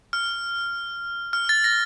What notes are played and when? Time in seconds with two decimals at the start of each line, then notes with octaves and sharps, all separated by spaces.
0.13 F6
1.33 F6
1.49 A6
1.64 A#6